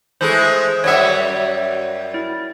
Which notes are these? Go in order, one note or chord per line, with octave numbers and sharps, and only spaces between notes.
E3 G#3 A3 G#4 C5
F#2 G3 C#5 E5 F#5
E4